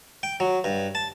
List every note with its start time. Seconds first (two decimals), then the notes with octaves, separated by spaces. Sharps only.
0.23 G5
0.40 F#3
0.64 G2
0.95 A5